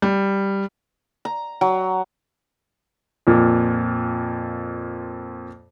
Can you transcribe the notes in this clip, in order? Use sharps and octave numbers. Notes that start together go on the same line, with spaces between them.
G3
A#5
F#3
F2 A#2